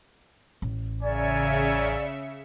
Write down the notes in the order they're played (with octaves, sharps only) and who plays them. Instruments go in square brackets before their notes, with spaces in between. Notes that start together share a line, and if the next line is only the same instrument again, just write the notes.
[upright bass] A1
[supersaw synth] C#3 E5 C#7 [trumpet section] A#4 C#5 G#5 [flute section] D5